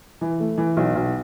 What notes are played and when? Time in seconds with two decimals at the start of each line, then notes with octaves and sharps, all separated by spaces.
0.21 E3
0.40 A3
0.58 E3
0.77 B1
0.95 B1